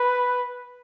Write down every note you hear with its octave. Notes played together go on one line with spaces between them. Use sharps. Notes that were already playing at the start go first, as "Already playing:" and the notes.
Already playing: B4